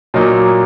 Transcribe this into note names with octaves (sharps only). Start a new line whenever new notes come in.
A#2 F#3 A#3 D#4